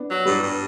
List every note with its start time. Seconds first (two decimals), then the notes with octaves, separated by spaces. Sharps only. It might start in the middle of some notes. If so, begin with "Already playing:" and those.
Already playing: B3 D4
0.09 F#3
0.25 G2 G3 B3
0.42 G2